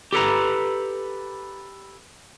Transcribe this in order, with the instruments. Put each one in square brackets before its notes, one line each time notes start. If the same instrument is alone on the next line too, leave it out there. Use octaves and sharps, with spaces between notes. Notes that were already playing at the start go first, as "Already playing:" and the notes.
[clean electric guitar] G4 A4 B4 A#5